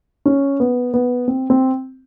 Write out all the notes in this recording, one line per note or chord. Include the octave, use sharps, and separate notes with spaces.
C#4
B3
B3
C4
C4